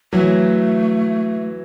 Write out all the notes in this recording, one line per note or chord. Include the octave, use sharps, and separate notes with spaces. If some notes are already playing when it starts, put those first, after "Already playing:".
E3 F#3 A3